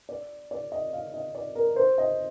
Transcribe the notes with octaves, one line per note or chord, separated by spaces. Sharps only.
D5
D5
D#5
F5
D#5
D5
A#4
C5
D#5